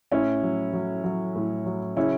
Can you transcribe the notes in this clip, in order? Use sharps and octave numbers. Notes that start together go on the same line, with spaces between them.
A2 C#4 E4
F#3
F#3
F#3
A2
F#3
C#3 C#4 E4